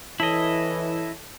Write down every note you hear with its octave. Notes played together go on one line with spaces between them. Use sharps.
E3 E4 A4 C#5 D#5 A5